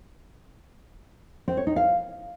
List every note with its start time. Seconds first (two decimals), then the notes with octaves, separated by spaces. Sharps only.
1.48 C4
1.57 C#5
1.67 D#4
1.76 F5